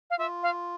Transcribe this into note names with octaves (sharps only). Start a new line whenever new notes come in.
F5
F4 E5
F5